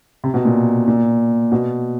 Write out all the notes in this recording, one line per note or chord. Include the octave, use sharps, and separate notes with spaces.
C3
B2
A#2
A#2
B2